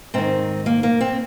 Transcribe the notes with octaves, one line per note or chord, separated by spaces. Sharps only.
G#2 D#3 C4
A#3
A#3
C4